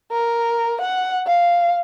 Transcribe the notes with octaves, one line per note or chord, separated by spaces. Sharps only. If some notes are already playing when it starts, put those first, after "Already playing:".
A#4
F#5
F5